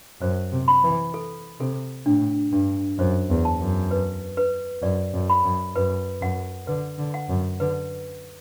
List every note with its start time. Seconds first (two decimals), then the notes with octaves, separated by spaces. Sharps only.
0.21 F#2 C5
0.52 C3
0.68 B5
0.84 E3
1.14 A4
1.60 C3 A4
2.06 A2 D4
2.52 G2 D4
2.99 F#2 C5
3.30 E2
3.45 A5
3.60 F#2
3.91 B4
4.37 B4
4.83 F#2 D5
5.14 F#2
5.29 B5
5.44 F#2
5.76 F#2 B4
6.22 F#2 F#5
6.67 D3 B4
6.98 D3
7.14 F#5
7.30 F#2
7.60 D3 B4